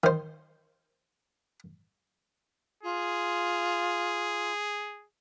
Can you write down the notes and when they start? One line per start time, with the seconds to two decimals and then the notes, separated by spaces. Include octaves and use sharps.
0.04 D#3 C5
2.83 F4 G#4